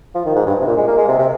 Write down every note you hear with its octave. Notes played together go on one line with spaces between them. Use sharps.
F3
D#3
G#2
G2
C3
A#2
G#3
A#3
G#3
C3
C3